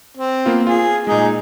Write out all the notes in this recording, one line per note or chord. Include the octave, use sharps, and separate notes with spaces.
C4
A#3 B3 F4
F4 G#4
A#2 G#3 D#4 G#4 D#5